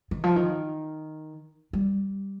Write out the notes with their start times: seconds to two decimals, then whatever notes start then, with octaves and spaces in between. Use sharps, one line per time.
0.11 D#3
0.24 F3
0.36 D#3
1.73 G3